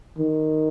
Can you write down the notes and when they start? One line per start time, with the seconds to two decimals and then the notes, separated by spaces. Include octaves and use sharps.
0.19 D#3